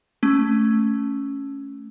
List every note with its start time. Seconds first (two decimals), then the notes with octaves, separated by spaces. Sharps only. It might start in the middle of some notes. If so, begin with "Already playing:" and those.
0.23 A3 C#4